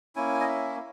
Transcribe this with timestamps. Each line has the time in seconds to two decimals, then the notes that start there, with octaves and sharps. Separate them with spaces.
0.16 A#3 C#4 E4 G#5
0.40 D#5
0.48 E5